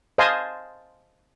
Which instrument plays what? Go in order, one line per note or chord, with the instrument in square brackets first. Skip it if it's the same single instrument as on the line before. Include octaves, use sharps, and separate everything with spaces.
[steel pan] C5 D#5 F5 G#5 A5 C6